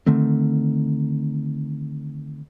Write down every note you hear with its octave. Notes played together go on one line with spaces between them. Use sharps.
D3 D#3 A3 C4